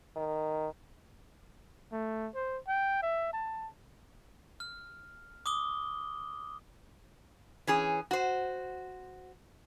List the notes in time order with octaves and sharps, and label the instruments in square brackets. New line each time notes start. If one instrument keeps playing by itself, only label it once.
[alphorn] D#3
[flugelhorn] A3
C5
G5
E5
A5
[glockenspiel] F6
D6 D#6 G7
[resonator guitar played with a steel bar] E3 C#4 G#4
F#4 C5